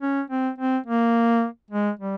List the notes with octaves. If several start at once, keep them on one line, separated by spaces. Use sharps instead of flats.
C#4
C4
C4
A#3
G#3
G3